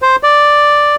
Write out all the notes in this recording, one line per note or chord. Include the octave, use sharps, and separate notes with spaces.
C5
D5